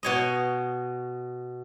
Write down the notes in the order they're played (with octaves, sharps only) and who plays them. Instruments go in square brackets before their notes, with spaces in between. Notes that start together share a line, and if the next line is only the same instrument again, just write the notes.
[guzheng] B2 C#5 D#5